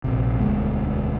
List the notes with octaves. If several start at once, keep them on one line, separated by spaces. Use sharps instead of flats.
A#1 C3
E1 D2 G#3 B3